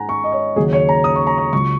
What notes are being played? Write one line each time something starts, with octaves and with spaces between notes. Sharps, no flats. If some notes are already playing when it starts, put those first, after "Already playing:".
Already playing: G#2 G#3 F#5 G#5 A#5
C#6
D#5
C#5
D#2 C#3 F#3 G#4
C#5
A#5
D#6
C#6
A#5
C#6
C#2 C#3 F#3 C#6